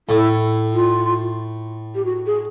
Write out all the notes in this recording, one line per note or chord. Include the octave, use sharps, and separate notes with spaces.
A2 E4
F4
G4
F#4
G#4